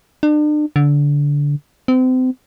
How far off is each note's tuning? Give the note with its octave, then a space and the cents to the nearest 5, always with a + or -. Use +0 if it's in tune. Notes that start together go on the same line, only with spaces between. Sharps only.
D4 +40
D3 -20
C4 -35